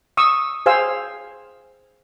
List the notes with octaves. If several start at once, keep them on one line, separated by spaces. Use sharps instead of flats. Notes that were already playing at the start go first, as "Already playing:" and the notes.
C#6 D#6 E6
G#4 C5 F5 G#5 E6